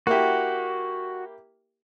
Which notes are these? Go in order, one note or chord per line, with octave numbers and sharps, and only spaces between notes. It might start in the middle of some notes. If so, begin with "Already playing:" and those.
A#3 E4 F#4 G4